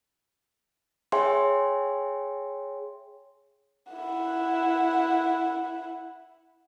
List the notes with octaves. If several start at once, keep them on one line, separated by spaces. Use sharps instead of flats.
G#4 C#5 E5 G5 G#5 C6
E4 F#5